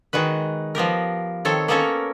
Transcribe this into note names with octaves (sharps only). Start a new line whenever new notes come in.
D#3 G#3 F#4 B4
F3 B3 G4 A#4
D#3 C4 A4 C#5
A#3 B3 C#4 A4 A#4 C#5